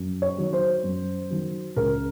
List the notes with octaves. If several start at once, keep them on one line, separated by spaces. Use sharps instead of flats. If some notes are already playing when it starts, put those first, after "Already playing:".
Already playing: F#2
C#5
D#3 F#3
C5
F#2
D#3 F#3
C#2 A#4